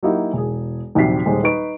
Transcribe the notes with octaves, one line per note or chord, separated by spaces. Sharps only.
F#3 A#3 D#4 E4 F#4 G4
E1 G#4
A#1 D#2 C3 F#3 B6 C7
D#1 G#3 C5
D#4 B4 C#6 D7